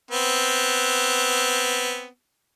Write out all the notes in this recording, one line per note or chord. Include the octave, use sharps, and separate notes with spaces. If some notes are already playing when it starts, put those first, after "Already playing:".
B3 C4